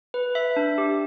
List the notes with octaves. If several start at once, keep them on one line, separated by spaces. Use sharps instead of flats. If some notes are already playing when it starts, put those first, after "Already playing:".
B4
E5
D4
G4